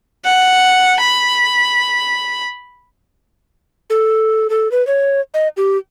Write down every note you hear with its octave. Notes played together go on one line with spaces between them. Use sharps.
F#5
B5
A4
A4
B4
C#5
D#5
G4